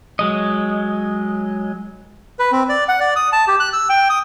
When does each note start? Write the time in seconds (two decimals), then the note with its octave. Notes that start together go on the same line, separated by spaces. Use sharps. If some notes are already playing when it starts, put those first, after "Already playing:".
0.19 F#3 G#3 D#5
2.39 B4
2.52 C4
2.69 D5
2.88 F#5
3.00 D5
3.16 D#6
3.32 A5
3.48 G4
3.60 F#6
3.73 E6
3.89 G5
4.10 D#6